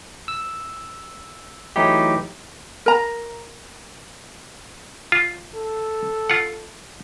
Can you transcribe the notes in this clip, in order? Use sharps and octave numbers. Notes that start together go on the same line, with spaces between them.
E6
E3 F#3 A3 D#4 E4 G4
A#4 A#5
F4
A4
F4 F#5